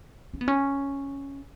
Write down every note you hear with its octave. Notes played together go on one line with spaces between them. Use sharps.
C#4
B3
C#4